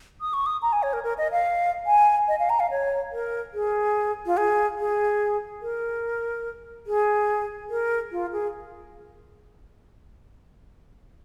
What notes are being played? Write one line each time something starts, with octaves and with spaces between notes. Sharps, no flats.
D#6
C#6
D#6
A#5
G#5
C#5
A#4
A#4
D#5
F5
G#5
D#5
F5
A#5
F5
C#5
A#4
G#4
F4
G#4
G#4
A#4
G#4
A#4
F4
G#4